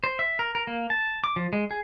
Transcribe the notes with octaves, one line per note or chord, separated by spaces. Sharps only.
C5
E5
A#4
A#4
A#3
A5
D6
F3
G#3
G#4